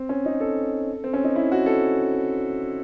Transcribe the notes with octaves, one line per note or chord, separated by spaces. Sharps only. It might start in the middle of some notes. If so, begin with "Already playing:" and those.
Already playing: C4
C#4
D#4
A4
C4
C#4
D#4
E4
F#4
A4